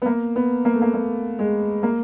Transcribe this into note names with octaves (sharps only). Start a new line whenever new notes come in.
B3
A#3
B3
A#3
A3
A#3
A#3
G#3
A#3